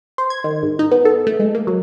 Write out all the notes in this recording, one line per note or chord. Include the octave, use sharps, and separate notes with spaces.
C5
G#6
D#3
G#2
D#4
B3
A4
A3
G#3
A#3
F#3